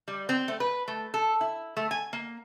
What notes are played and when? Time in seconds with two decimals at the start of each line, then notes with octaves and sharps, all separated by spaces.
0.08 G3
0.29 C4
0.48 A3
0.60 B4
0.88 A3
1.14 A4
1.41 E4
1.77 A3
1.91 G#5
2.13 A#3